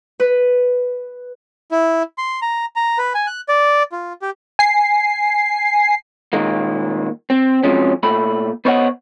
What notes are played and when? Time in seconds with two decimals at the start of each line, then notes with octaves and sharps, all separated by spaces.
0.20 B4
1.71 E4
2.18 C6
2.42 A#5
2.76 A#5
2.98 B4
3.14 G#5
3.27 F#6
3.49 D5
3.92 F4
4.22 G4
4.59 G#5 C7
6.33 A#2 D#3 G#3 A#3
7.30 C4
7.63 C3 F3 F#3 G#3 C#4
8.03 A#2 A3 B5
8.65 B3 C5 C#5 D#5 F5 F#5